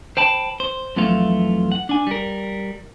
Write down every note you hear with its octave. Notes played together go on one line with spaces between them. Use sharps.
C5 G5 A5 B5
C5
F2 E3 F#3 A3 F4
F#5
D4 G#5
G3 A#4